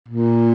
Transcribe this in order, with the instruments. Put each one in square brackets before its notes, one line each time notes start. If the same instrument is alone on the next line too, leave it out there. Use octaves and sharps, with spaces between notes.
[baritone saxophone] A#2